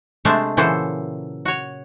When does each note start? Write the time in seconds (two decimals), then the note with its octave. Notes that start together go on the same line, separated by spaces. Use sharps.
0.25 C3 G#3 A3 D4 C5 A5
0.57 A#2 C#3 E3 F#3 A4 C5
1.45 F#4 C#5